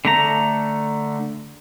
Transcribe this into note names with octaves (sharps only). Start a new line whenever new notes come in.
D3 A3 A#5